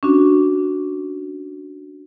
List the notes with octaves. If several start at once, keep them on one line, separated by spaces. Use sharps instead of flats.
C#4 D4 F#4